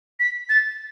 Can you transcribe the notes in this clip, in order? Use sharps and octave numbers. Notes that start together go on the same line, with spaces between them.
B6
A6